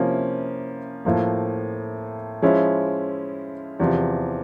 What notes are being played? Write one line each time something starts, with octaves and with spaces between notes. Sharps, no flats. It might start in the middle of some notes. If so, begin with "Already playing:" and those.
Already playing: C3 F3 A#3 C#4 E4
A2 F3 A#3
F3 G#3 C#4 E4
E2 C3 F3